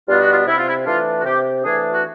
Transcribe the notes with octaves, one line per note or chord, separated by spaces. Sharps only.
B2 G3 B3 D4 F4
F#4
F4
C3 E4
F4
E4
E3 A3 D4 F4
F#4
C3 G4
E3 A3 D4 G#4
F#4